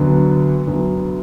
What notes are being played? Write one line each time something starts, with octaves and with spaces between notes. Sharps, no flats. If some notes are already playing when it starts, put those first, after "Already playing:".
Already playing: D2 D3 F#3 B3
D2 D3 F#3 B3